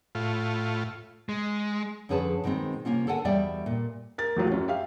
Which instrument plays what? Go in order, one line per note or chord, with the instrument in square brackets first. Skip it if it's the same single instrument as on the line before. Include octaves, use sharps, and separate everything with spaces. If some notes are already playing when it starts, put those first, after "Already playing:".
[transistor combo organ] A2 F4
[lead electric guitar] G#3
[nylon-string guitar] F2 D3 C#4 G#4 B4 A5
B2 D#3 G#3 C4
C3 A#3 C#4 F4
D3 A4 A#4 F#5 G#5
E2 B2 G3 D5 E5 G5
A#2
[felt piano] A#4 A6
E2 A2 F#3 F4
F#2 C#4
G4 E5 F5